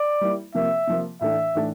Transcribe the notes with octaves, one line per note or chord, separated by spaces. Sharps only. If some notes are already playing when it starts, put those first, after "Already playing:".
Already playing: D5
G3 A#3 E4
C3 F3 A#3 E5
C3 F3 A#3
A2 E3 A3 D4 A4 E5
A2 E3 A3 D4 A4